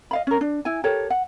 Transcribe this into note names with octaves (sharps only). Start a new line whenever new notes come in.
D#5 F5 B5
C#4 A#4
D4
E4 G#5
G4 A4 A#4 C#5
F#5